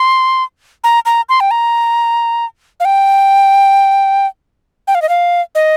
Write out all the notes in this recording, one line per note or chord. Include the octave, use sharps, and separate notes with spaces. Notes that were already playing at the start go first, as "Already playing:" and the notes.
Already playing: C6
A#5
A#5
C6
G5
A#5
F5
G5
G5
F5
D#5
F5
D#5